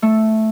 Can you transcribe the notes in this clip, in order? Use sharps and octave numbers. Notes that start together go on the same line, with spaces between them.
A3